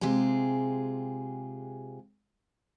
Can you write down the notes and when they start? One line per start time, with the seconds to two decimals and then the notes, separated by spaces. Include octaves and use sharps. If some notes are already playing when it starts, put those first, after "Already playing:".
0.01 C3 G#3 F4 G4 G#4